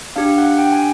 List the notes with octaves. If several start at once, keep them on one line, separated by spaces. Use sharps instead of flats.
D4 G4 F5
F#5
G5
G#5